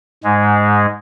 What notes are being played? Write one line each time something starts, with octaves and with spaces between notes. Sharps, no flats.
G#2 G#3